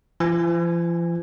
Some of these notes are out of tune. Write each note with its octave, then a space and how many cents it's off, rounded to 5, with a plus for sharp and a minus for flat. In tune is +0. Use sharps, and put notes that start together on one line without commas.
F3 -45 G#5 -15